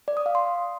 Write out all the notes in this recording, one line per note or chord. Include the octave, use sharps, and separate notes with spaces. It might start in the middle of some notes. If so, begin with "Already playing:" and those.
D5
D#6
F5
C6